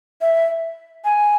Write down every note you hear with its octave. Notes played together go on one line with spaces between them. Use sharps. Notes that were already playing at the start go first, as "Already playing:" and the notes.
E5
G#5